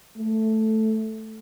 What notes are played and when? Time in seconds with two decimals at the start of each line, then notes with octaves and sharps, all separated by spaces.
0.17 A3